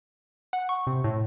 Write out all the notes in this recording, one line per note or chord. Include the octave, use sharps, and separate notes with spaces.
F#5
C#6
C3
A2